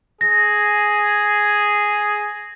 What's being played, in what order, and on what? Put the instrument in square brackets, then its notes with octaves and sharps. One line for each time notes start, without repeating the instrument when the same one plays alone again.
[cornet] G#4 [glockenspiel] A#6